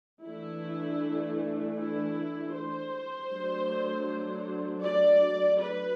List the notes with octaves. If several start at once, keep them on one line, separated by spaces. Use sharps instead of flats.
E3 A3 D4 E4
E4
C5
F#3 A3 D4
D5
B4